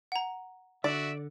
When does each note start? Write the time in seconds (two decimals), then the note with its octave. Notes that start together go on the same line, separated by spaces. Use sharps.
0.12 F#5 A#5
0.84 D3 F#4 D5 E5